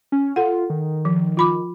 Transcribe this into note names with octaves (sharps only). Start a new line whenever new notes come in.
C#4
F4 A4 F#5
D#3
F3
F4 B5 D6